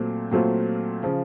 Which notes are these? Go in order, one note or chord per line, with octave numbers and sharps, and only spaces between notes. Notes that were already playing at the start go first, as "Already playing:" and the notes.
Already playing: A#2 F#3 A3 C4
A#2 F#3 A3 C4 F4
C#3 F3